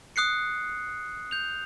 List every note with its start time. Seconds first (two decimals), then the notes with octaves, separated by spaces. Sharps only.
0.16 D#6 F#6 C7 C#7
1.31 G6 F7